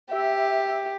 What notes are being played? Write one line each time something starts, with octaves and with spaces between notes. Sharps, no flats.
G4 E5